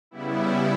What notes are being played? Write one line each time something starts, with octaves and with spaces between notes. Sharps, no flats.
C#3 G3 B3 E4